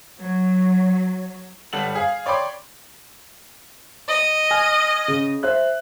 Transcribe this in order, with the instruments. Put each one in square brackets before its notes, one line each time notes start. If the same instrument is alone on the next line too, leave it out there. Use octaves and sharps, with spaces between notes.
[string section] F#3
[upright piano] G1 G3 A4 F#5 F#7
G#4 F5
C#5 D5 G5 B5 C6 D6
[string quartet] D#5
[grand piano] G#5 F6
C#3
C5 E5 F#6